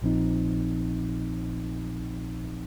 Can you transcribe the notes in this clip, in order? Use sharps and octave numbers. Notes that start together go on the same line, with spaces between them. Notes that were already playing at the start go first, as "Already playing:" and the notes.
A#1 A#2 F3 C4 D#4